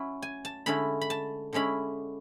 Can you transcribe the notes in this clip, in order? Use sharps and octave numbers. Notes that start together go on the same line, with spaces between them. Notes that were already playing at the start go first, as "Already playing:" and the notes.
Already playing: F#3 C#4 E4 B5
G#5
A5
D3 G#3 C#4 E4 B5
B5
A5
D3 G#3 C#4 E4 B5